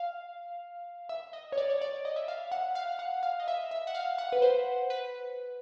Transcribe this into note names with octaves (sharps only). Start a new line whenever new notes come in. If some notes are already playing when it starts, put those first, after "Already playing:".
Already playing: F5
E5
D#5
C#5
D5
C#5
D5
D#5
E5
F5
F#5
F5
F#5
F5
D#5
E5
E5
F#5
F5
F#5
B4
C5
B4